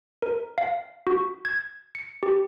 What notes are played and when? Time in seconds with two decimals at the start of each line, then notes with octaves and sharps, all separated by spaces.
0.22 A#4
0.58 F5
1.07 F#4
1.45 G#6
1.95 C#7
2.23 G4